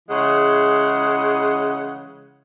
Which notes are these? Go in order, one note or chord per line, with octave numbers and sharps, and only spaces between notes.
C#3 E3 G#3 F#5